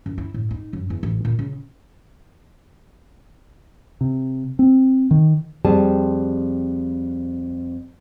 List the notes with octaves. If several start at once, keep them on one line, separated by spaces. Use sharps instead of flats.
F#2
E4
A2
D#4
F#2
E2
A1
A#2
C#3
C3
C4
D#3
F2 G3 C4 G#4 A5